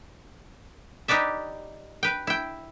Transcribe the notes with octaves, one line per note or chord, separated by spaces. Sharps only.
D#4 G4 B4 D5 E5
B4 G5
E4 G5